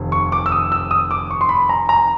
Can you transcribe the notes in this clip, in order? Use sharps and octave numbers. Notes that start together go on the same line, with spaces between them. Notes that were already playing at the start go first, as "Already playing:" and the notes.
Already playing: F1 D#2
C#6
D6
E6
D#6
E6
D#6
D6
C#6
C6
B5
A#5
A#5